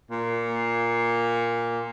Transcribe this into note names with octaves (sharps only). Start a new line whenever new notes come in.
A#2